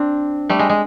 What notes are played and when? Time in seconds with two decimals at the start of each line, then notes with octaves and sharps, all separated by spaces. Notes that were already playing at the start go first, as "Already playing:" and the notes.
Already playing: C4 D4
0.49 G3 A3
0.59 G#3
0.69 G#3